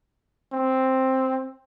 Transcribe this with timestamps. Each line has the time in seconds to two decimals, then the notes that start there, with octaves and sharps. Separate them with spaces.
0.53 C4